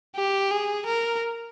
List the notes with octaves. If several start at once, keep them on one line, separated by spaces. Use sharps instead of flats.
G4
G#4
A#4